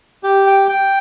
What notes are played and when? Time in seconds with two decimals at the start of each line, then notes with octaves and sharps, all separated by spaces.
0.23 G4
0.47 G5
0.69 G5